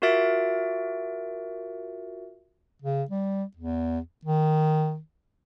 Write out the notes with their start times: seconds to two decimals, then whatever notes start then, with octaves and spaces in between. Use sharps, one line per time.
0.02 F4 F#4 A#4 E5 A6 D7
2.82 C#3
3.11 G3
3.57 E2
4.25 D#3